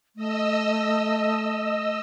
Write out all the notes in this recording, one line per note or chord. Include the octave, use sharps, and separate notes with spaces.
A3 D#5 E6